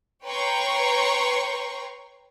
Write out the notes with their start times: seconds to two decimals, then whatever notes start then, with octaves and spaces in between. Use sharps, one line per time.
0.24 B4 C#5 G5 A#5 C6 C#6